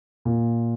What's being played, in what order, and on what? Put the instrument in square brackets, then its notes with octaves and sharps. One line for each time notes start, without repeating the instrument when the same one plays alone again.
[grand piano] A#2